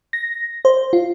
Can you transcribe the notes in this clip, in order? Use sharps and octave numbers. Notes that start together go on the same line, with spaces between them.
A#6
C5
F4